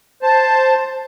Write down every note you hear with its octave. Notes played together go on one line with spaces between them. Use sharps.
C5 A5